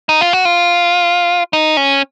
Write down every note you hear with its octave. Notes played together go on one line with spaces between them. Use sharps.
D#4
F4
F#4
F4
D#4
C#4